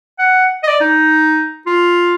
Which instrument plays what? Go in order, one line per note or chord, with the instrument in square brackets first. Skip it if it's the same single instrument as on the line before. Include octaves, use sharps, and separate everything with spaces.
[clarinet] F#5
D#5
D5
D#4
F4